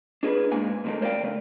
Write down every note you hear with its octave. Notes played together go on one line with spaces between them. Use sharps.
D4 G#4 A#4 B4
G#2 A#3 G#5
A#2 D#3 F#3 A3 A#3
A#4 C5 D5 D#5 F5 G5
C#3 A3